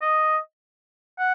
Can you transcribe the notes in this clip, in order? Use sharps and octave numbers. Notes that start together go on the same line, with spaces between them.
D#5
F#5